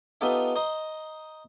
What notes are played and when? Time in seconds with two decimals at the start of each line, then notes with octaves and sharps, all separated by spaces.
0.21 B3 D#4 F4 G4 A4 E5
0.56 C5 D#5 A#5